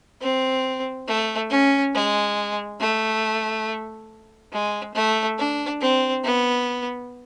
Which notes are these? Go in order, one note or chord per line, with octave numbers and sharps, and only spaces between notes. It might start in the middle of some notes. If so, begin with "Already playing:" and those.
C4
A3
C#4
G#3
A3
G#3
A3
D4
C4
B3